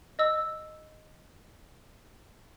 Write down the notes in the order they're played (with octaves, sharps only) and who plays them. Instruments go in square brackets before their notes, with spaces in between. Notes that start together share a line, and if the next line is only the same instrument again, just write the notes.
[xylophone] D#5 E6